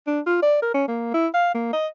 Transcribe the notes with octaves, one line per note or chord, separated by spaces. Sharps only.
D4
F4
D5
A#4
C#4
A#3
E4
F5
A#3
D#5